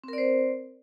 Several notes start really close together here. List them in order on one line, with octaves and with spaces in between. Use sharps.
C4 A#4 D5 C5